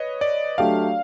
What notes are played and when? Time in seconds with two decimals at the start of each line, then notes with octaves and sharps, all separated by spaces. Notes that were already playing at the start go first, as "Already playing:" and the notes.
Already playing: B4 C#5 D#5
0.21 D5
0.58 F#3 A3 D4 G4 F5